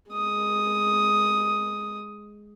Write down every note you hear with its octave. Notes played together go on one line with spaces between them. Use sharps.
G#3 D#6